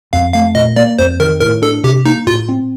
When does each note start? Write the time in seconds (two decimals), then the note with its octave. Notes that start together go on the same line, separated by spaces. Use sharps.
0.13 F2 F5
0.33 A3 F5
0.55 A#2 D#5
0.76 A#3 D5
0.99 F2 C5
1.20 D#3 A#4
1.40 A2 A#4
1.62 D4 A4
1.84 C3 G4
2.05 A#3 D#4
2.26 A2 F4
2.49 C4